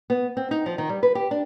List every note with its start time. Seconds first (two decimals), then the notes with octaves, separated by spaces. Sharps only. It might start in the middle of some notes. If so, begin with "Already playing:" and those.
0.10 B3
0.37 C4
0.51 D#4
0.66 F3
0.78 D#3
0.89 G3
1.03 B4
1.15 G4
1.31 D4